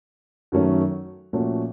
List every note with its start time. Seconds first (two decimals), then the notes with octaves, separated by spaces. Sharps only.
0.52 F#2 D#3 F#3 A3 C#4
1.33 A#2 F3 A3 C#4 F#4